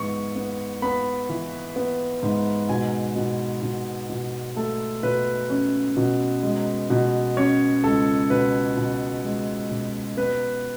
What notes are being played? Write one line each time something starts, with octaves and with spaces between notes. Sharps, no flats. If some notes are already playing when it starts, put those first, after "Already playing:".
Already playing: G#2 E3 B3 C#6
B3
B3 B5
E3
B3
G#2
B2 G#5
B2
B2
B2
A3 A4
B2 B4
C#4
B2
G#3
B2
C#4 C#5
C#2 A4
B2 B4
B2
G#3
B2
B3 B4